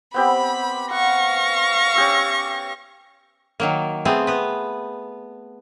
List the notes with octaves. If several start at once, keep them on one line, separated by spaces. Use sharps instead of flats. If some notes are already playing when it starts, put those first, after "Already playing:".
B3 C4 G4 B5
F5 F#5 C#6 A#6
C#4 G4 E6
D#3 F#3 A#3
A3 B3 C4 G#4
B3 B4